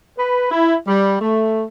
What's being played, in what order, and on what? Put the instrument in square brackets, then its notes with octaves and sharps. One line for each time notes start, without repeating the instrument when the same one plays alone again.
[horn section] B4
E4
G3
A3